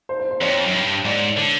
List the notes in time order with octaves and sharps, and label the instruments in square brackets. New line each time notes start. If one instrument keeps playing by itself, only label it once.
[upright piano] C5
C5
C5
[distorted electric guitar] F2 [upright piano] C#5
[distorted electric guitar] F#2
G2
[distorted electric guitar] G#2 [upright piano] D5
[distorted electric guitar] D3